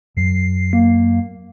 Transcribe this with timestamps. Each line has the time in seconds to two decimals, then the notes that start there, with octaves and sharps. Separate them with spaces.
0.17 F#2 F#3 C7
0.73 A#3